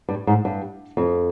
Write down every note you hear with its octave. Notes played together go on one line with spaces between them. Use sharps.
G2
G#2
G2
F2